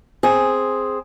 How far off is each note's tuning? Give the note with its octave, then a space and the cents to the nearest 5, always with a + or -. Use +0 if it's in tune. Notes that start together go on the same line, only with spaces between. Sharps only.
C4 +0 G#4 +0